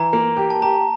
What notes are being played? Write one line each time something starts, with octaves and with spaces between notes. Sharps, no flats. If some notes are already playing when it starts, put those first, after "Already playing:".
Already playing: E3 A#5
A#3
G4
A5
G4 A#5